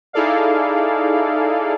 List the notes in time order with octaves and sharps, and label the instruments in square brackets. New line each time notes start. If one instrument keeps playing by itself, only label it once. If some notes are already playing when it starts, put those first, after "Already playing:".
[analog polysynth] D#4 E4 G#4 A4 D5 F5